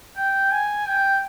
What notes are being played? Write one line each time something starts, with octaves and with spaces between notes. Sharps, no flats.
G5
G#5
G5